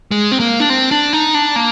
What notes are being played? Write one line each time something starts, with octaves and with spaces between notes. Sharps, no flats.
G#3
C4
A#3
D4
C4
D4
D#4
D4
A#3